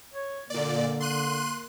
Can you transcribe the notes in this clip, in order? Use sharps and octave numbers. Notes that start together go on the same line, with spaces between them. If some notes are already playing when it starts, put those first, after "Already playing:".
C#5
A#2 D3 A#3 D5
C6 F#6 D#7